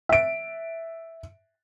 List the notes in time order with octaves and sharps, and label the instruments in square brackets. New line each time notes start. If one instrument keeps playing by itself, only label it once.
[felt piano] E5 D7